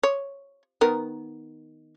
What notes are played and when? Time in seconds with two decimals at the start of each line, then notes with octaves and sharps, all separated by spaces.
0.03 C#5
0.81 D#3 B3 A#4